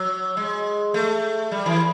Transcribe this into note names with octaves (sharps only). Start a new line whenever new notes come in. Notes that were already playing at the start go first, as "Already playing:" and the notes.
Already playing: F#3
G#3
A3
G3
E3